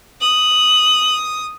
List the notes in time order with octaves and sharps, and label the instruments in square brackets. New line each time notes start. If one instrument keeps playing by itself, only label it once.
[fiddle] D#6 [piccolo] F#7